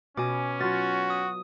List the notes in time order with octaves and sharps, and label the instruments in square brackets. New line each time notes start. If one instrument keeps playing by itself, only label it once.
[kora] B2 B3 [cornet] C#4 [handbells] G#5 D6
[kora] F#3 F4 [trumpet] F#4 [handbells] A6
[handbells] D#6